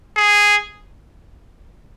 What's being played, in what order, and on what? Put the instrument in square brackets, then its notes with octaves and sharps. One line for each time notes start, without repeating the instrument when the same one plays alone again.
[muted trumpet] G#4